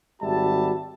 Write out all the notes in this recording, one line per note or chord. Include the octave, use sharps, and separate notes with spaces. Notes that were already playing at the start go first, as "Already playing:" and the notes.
G#1 G3 F#4 E5 A5